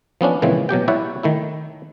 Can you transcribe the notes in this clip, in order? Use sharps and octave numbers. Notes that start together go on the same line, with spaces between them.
F3 B3 C#4 D4
A#2 C#3 E3 F3 G#3 C4
B2 F#3 G4 G5
G3 E4 C#5 D5 E5 F#5
D#3 A3 E4